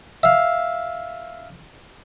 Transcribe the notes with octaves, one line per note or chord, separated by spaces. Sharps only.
E5 F5